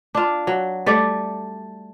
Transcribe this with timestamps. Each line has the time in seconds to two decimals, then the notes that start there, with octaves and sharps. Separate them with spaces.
0.15 D4 F4
0.47 F#3
0.86 G3 A3 D5